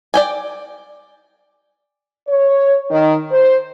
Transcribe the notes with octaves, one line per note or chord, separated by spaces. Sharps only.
D5 G5 G#5
C#5
D#3
C5